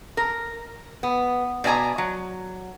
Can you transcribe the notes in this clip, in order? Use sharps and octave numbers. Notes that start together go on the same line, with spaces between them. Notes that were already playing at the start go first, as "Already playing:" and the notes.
A#4
B3
B2 D5 D#5 G#5 A#5
F#3